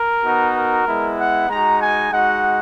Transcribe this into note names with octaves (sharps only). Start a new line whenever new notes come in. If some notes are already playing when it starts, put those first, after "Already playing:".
Already playing: A#4
B3 D#4 F#4
A#4
G#3 B3 E4
F#5
G#3 D#4 F#4 A#5
G#5
G#3 D#4 F#4 F#5